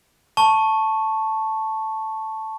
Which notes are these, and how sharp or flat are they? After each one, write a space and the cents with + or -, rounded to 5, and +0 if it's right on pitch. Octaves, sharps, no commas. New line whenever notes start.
A5 +0 C#6 -5